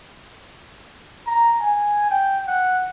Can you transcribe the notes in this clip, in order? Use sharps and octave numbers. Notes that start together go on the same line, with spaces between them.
A#5
G#5
G5
F#5